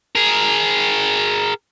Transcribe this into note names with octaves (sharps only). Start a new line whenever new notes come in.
G#4 A#4